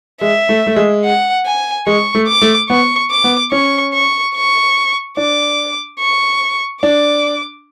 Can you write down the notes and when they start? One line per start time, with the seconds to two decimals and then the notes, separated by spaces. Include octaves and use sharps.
0.21 G#3 E5
0.49 A3
0.67 A3
0.76 G#3
1.04 F#5
1.45 G#5
1.87 G#3 C#6
2.15 A3
2.28 D6
2.42 A3
2.70 B3 C#6
3.11 D6
3.24 B3
3.52 C#4 C#6
3.94 C#6
4.35 C#6
5.17 D4 D6
6.00 C#6
6.83 D4 D6